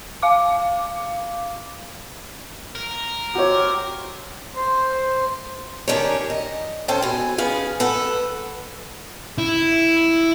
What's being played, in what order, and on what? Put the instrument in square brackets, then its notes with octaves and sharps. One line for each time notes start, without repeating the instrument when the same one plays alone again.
[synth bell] F5 D6
[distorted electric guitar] A#4
[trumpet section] C4 G4 [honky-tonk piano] F#4 C#5
[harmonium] C5
[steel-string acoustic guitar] D#3 C#4 D4 G4 A#4 C#5
D#5
C#4 A4 C5 G5 A5
B2 G#5
B3 C#4 G#4 F5
A4 B4 F#5
[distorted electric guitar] E4